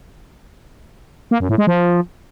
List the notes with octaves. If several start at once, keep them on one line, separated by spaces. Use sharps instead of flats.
A#3
F#2
A2
G#3
F3